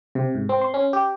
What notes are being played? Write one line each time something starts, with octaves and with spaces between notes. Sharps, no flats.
C3
G#2
C4
C6
C#4
G4